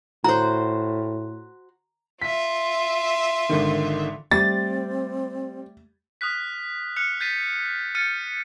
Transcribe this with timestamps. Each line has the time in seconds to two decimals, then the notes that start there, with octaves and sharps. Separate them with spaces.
0.24 A2 F#4 C5 A#5
2.22 F4 E5 B6
3.49 G#1 D3 D#3
4.31 G3 A3 C4 A6
6.21 D#6 F6 F#6 B6
6.96 F6 F#6 C#7 F7
7.20 G6 A6 B6 C7 D#7
7.95 F6 G6 A6 C#7 D#7